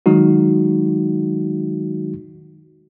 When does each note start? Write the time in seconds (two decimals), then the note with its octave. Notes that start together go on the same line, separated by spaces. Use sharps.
0.06 D#3 F#3 G#3 D#4 F#4